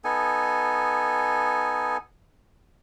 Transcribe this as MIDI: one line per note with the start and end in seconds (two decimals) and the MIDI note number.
0.04 1.97 59
0.04 1.97 63
0.04 1.97 69
0.04 1.97 80